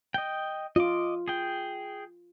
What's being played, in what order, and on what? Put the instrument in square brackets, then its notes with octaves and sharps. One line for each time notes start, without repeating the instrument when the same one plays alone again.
[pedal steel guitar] D#5 G5
[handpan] F4 [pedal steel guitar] D#5 D6
[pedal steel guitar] G#4 G5